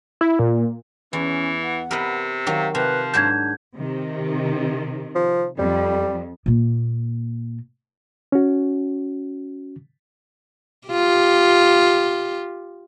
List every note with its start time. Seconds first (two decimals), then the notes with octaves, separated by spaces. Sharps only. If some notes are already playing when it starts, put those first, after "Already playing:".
0.21 E4
0.39 A#2
1.13 E2 E3 C#4
1.63 F#5
1.91 C3 A#4 B4 D#5
2.47 D#3 F#3 F5
2.75 C3 F3 B4
3.14 G#2 F#3 D4 A5 G6 G#6
3.74 C3 D#3
5.15 F3
5.59 F2 G3
6.46 A#2 A#3
8.32 C#4 F#4
10.88 F4 G4